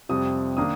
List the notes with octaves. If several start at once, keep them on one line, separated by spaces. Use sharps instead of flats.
F2 C3 G3 D#6
D#3 A#3 D4 D#6